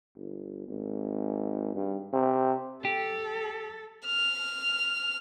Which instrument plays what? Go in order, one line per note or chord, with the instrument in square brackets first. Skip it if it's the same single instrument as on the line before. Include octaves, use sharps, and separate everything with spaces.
[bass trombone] G1
G#1
G2
C3
[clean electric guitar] G4 [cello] A4
[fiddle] F6